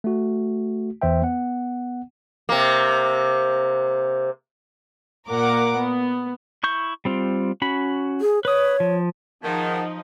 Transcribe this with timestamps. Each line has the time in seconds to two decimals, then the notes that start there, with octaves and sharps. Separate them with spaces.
0.04 A3 F#4
1.02 E2 E3 C5 E5 G5
1.22 B3 F#5
2.49 C3 A#3
5.30 A#2 A#3 A#4 F#5 D6
5.78 B3
6.63 E4 C#6 G6
7.05 G3 C4 F4
7.62 C#4 F#4 B5
8.21 G#4
8.45 B4 C#5 D#6
8.80 F3
9.43 G#2 D#3 F3 D#4 F#5 A5